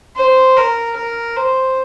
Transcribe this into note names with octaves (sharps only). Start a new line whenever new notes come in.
C5
A#4
A#4
C5